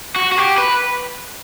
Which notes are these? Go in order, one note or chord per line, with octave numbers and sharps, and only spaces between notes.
F#4
F#4
G4
B4